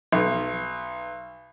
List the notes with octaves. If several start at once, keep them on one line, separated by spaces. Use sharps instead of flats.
B1